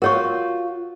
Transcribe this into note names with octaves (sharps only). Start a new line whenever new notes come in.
F4 F#4 A#4 C#5 C#6